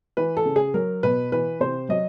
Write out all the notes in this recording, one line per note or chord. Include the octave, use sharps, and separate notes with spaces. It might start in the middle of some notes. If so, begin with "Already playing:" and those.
E3 B4
A4
C#3
G#4
F#3 A#4
B2 B4
E3 B4
C3 C5
F#3 D#5